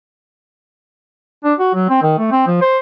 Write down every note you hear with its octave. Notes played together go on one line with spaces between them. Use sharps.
D4
F#4
F#3
C4
D#3
A3
C4
F3
C5